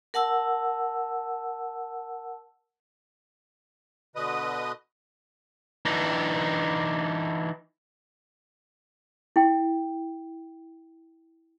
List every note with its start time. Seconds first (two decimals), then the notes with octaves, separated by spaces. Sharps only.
0.14 A#4 F#5 A5 E6
4.16 B2 D3 B4 D#5 D#6
5.85 E3 D4 D#4
9.36 E4 G5